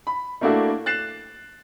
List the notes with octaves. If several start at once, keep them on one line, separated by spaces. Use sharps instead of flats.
B5
A3 A#3 D4 E4 F#4 A4
F#6 A6 C7 E7